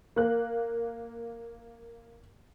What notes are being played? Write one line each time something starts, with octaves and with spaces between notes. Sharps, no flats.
A#3 F#6